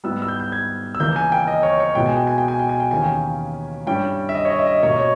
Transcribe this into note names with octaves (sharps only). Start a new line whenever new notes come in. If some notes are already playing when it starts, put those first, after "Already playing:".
G#2 G3 B3 E4 E6
E6
G6
G6
G#6
E6
C#2 C#3 E3 A#3 G6
G#5
G5
D#5
C#5
C#5
B2 G#3 B3 E4 G5
G#5
G5
G#5
G5
G#5
G5
G#5
G5
D#2 C#3 E3 A#3 C#4 G#5
G5
G2 G3 C#4 E4 G5
E5
D#5
C#5
D#5
E5
D#5
B2 A#3 C#4 C#5
D#5
C#5